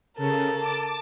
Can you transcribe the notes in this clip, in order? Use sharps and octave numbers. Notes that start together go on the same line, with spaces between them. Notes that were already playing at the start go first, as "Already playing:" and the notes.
C#3 A4 A#4
A5 D6